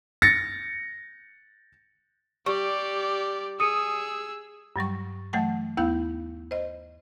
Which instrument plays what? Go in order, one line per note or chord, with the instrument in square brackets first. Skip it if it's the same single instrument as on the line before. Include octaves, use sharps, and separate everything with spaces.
[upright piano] A6 A#6 C#7
[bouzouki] G3 [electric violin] G4 D5 [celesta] C#6
[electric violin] G#4 E6 [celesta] D#6 C#7 D#7
[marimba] G2 F#3 G3 C#6
E3 F#3 A3 F#5 G5 A5
D#2 B3 E4 F5 G6
C5 D#5